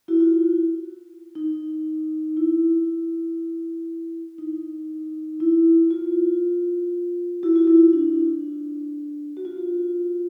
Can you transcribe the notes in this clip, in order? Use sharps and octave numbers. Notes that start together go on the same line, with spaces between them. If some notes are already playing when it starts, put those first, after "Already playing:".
E4 F#4
F4
D#4
E4
D#4
E4
F4
E4 F#4
F4
E4
D4
F#4
F4